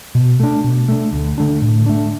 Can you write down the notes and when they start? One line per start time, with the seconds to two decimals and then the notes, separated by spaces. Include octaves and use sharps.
0.15 B2
0.40 A3 D4
0.64 B2
0.88 A3 D4
1.13 D2
1.38 D3 A3 D4
1.62 A2
1.86 A3 D4